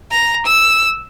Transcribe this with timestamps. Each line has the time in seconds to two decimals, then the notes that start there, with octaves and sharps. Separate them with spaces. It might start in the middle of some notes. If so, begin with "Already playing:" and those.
0.11 A#5
0.46 E6